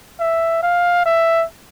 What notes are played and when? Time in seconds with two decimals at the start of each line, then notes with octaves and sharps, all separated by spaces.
0.20 E5
0.63 F5
1.06 E5